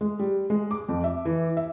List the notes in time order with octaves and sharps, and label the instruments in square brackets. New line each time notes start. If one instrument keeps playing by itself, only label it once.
[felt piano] G#3
G3
G#3
D6
F2
E5
E3
E5